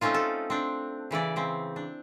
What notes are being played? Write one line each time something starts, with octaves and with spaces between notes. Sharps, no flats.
A3 C4 C#4 D#4 F4
A4
C4 D4
C#3 E3 E4 D5
C#3 C4
D4